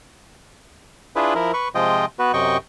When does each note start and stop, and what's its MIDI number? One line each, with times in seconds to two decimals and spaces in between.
1.16 1.34 62
1.16 1.34 64
1.16 1.34 65
1.16 1.34 68
1.16 1.34 71
1.35 1.52 53
1.35 1.52 64
1.35 1.52 70
1.54 1.68 71
1.54 1.68 85
1.75 2.05 48
1.75 2.05 53
1.75 2.05 56
1.75 2.05 65
1.75 2.05 75
1.75 2.05 79
2.19 2.32 59
2.19 2.32 66
2.19 2.32 71
2.33 2.57 42
2.33 2.57 48
2.33 2.57 75
2.33 2.57 79
2.33 2.57 85